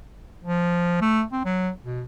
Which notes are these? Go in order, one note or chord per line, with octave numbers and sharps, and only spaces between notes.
F3
A3
C4
F#3
B2